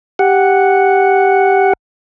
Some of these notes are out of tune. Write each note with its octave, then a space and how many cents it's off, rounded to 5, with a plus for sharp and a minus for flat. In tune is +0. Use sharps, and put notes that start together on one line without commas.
G4 +0 F#5 +0